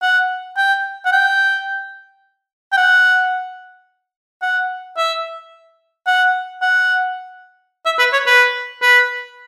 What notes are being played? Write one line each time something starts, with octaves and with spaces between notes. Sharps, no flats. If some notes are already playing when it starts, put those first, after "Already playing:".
F#5
G5
F#5
G5
G5
F#5
F#5
E5
F#5
F#5
E5
B4
C#5
B4
B4